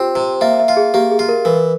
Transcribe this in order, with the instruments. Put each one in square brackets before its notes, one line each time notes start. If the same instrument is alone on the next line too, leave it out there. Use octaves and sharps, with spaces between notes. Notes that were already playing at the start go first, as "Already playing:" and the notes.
Already playing: [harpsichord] C4 [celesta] F4 G4
[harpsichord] C3
[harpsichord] A#3 [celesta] E5
[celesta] E5
[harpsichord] F4
[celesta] G#4
[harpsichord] A#3 [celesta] G4
[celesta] G#4
[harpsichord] F4
[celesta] A#4
[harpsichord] E3 [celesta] A#4